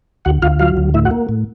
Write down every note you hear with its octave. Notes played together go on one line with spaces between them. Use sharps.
D2 F#4 F#5
D2 F4 F5
F#3 F4 F5
D2
A2 E4 E5
F#4 F#5
A#3
A2